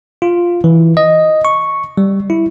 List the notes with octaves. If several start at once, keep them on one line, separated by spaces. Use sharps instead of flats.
F4
E3
D#5
C#6
G3
E4